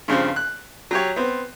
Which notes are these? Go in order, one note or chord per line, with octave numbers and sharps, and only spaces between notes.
G2 C#3 F3 C4
F#6
F#3 G4 C#5
B3 C4